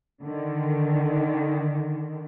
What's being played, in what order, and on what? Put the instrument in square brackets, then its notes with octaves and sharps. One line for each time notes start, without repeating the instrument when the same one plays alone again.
[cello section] D3 D#3